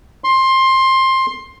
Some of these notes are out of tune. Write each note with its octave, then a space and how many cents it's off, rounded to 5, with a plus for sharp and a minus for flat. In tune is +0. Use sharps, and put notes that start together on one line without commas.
C6 +15